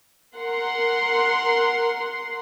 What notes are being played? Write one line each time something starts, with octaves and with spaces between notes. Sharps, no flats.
A#4 F#5 C6